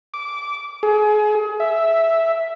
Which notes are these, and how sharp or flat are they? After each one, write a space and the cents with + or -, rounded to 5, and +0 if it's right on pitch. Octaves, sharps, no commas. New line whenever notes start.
D6 -15
G#4 +30
E5 +0